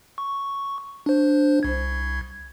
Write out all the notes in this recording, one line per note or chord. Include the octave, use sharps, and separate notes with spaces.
C#6
D4 C5
C2 G#6